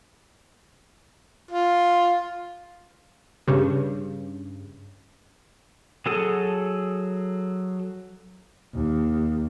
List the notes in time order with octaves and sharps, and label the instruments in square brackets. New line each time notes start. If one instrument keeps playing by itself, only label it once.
[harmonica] F4
[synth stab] G2 C#3
[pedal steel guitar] F#3 G#4 A4 D#6
[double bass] D#2